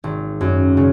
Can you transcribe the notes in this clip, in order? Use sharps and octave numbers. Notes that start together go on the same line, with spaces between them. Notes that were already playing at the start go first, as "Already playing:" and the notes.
G#1
F#2
C#3